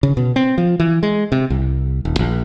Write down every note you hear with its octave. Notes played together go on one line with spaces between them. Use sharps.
C#3
B2
C4
F3
E3
G#3
C3
C2
D#1
A#1